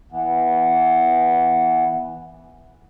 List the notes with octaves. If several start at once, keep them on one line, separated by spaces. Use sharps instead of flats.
E3 B3